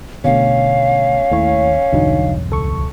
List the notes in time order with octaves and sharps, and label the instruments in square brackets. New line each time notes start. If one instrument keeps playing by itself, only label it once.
[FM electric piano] B2 A3 [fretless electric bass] D3 D4 [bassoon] C#4 [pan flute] F5
[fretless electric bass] D#2 [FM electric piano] A3 E4 C#5
[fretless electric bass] B1 E2 G2 [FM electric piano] D3 F#3 D#4
[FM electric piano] C#2 A4 C#6